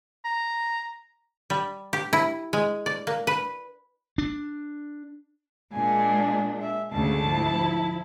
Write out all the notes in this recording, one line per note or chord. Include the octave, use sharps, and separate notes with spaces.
A#5
G3
G4
E4
G#3
D5
A#3
B4
D4
A#2 G#3 D4 G#5
E5
D2 G#2 C#3 A3 A5
F3 E4